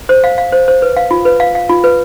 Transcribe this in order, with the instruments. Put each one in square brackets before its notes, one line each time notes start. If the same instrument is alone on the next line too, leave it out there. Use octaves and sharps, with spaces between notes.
[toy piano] C5
F5
F5
C5
C5
B4
F5
F4
B4
F5
F5
F4
B4